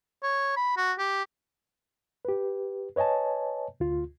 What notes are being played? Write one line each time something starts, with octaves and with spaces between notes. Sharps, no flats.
C#5
B5
F#4
G4
G4 B4
B4 C#5 D#5 G#5 A5
D2 F4